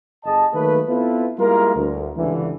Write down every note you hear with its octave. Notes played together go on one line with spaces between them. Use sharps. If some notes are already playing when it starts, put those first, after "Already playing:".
G1 G#4 D#5 A5
D#3 F#3 A3 A#3 B4
B3 C4 E4 F4 A4 B4
G3 G#3 A#3 E4 F4 A#4
D2
C#2 G2 D3 E3